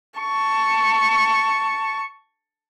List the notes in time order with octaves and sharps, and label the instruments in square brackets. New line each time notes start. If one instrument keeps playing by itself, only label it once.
[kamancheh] A5 C#6